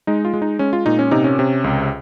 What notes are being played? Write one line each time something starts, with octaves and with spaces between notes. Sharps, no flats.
G#3 D#4
F4
G#3
D#4
G#3 C#4
F4
A#2 D#4
C#4
C3 D#4
C#4
C3
C#2